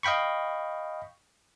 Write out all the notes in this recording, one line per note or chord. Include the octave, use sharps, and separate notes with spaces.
D#5 F5 G5 B5 C#6